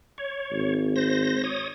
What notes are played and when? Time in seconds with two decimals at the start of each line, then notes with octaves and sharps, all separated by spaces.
0.18 C#5
0.51 G#1
0.96 C5 A#6
1.44 C#5 D#6